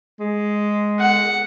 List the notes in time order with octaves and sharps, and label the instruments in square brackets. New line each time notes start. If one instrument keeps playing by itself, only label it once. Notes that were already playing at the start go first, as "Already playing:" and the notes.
[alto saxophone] G#3
[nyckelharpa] F#5